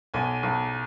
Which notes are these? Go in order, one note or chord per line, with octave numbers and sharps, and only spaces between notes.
B1 G#5
B1